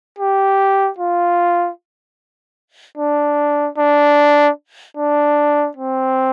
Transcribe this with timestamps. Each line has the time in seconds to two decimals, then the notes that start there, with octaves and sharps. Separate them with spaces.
0.19 G4
0.99 F4
2.98 D4
3.78 D4
4.97 D4
5.77 C4